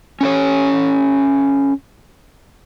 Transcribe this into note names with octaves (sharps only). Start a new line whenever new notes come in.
C#4 A4 C#5